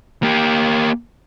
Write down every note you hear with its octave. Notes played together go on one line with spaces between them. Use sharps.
A#3 G4